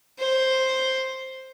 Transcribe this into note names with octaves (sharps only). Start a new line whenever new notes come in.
C5